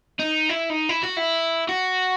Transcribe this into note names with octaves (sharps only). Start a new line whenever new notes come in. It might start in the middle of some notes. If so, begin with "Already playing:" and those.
D#4
E4
D#4
E4
F#4
E4
F#4